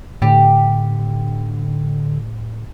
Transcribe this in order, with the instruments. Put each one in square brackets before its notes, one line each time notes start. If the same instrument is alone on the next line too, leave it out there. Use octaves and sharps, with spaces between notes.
[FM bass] A2 [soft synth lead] D3 [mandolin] G4